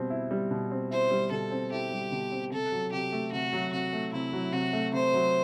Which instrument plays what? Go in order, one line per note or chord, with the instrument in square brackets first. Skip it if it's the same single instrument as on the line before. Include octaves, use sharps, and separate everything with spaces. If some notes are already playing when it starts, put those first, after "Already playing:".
Already playing: [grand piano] B2 G3 C4
E4
G3
B2
C4
[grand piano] E4 [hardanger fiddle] C5
[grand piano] G3
[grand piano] B2 [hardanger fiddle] A4
[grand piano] C4
[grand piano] E4 [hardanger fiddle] G4
[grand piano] G3
B2
C4
[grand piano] C3 [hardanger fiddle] A4
[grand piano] F#3
[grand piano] C3 [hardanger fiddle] G4
[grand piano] A3
[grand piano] C3 [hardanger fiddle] F#4
[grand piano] F#3
[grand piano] C3 [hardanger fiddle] F#4
[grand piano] A3
[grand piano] C3 [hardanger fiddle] E4
[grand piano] F#3
[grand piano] C3 [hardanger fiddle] F#4
[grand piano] A3
[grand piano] C3 [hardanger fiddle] C5
[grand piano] F#3